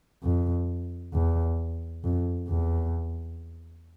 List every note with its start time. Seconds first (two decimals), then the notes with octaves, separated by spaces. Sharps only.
0.24 F2
1.14 E2
2.04 F2
2.49 E2